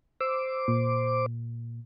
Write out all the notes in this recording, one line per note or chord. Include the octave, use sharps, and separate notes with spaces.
C5 D6 E6
A#2